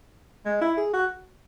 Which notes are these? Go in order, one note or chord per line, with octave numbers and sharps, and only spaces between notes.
G#3
E4
G#4
F#4